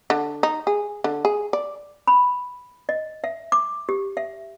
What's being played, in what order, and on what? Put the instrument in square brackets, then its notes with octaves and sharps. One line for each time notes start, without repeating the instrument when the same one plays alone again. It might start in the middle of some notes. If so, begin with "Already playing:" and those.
[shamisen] D3
D#4
G#4
D3
G#4
D5
[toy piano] B5
D#5
E5
D6
G4
E5